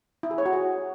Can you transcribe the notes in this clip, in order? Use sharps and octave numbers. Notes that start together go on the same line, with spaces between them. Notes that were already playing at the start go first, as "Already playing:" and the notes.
E4
G#4
C#5
F#4
G#4